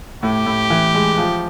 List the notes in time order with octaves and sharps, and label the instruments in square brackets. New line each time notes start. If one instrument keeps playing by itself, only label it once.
[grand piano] A2 [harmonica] G4
[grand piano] A2
E3
G#3
F3